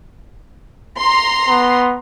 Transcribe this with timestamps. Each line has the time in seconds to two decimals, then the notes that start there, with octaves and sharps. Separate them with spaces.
0.98 A#5 C6
1.49 B3